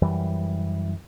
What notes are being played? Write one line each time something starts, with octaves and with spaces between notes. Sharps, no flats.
F#2 E3 G3